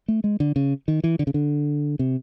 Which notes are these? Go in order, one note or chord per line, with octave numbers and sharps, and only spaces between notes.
A3
G#3
D3
C#3
D#3
E3
D3
C#3
D3
C3